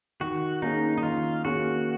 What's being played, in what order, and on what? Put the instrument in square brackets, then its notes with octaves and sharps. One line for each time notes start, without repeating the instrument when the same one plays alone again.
[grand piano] D#3 [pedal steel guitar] F#4
[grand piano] A#3 C#4 G#4 [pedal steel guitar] D#4
[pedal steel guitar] D#4
[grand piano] D#3 [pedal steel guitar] F4
[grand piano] A#3 C#4 G#4 [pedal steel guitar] F#4